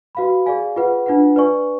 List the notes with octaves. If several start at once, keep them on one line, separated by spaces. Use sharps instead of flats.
F#4 B4 F5 B5
G#4 D5 F5 G#5
F4 G#4 B4 F#5
D4 F4 B4 F#5
B4 D5 G#5 C#6